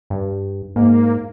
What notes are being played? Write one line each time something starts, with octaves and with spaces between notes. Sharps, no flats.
G2
G#2 A#3